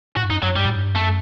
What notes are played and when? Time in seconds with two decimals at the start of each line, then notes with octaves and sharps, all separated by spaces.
0.16 A2 F#4
0.24 G2
0.30 F#2 D#4
0.43 F#2 F#3
0.56 G2 G3
0.65 A2
0.75 G2
0.95 F#2 A3